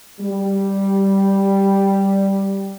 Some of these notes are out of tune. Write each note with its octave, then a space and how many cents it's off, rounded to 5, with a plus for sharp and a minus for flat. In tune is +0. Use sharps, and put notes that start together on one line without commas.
G3 -5